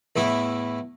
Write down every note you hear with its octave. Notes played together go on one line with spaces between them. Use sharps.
E2 A2 E4